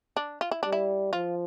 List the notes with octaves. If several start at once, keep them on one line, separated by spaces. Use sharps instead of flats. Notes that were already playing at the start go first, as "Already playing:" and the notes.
D4
F4
E4
G3 D4
E4
F3 F4